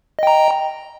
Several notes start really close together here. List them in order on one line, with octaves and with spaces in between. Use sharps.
D#5 G5 A#5